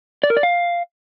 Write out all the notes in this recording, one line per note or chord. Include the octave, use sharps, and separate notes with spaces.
D5
A#4
D5
F5